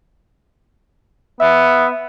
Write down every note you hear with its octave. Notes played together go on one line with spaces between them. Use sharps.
B3 E5